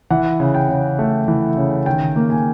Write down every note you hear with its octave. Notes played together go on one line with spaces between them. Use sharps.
E3 F#5
C#3
G5
C#3
A3
E3
C#3
D#3 G5
A#3
G#5